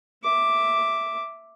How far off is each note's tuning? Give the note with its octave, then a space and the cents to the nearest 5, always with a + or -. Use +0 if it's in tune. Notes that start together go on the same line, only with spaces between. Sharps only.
E5 +0 D6 +0